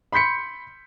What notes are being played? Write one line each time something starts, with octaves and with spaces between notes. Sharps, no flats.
B5 C6 G6 B6 C#7